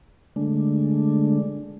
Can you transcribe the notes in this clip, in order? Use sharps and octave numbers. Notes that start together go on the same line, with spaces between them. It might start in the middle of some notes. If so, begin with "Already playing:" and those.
D3 G#3 A3 D4